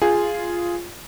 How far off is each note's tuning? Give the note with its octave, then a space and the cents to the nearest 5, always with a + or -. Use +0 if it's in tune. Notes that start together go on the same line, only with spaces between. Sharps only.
F4 -5 G#4 +0